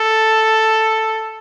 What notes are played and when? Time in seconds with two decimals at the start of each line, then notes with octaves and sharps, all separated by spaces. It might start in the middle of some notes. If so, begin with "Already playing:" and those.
Already playing: A4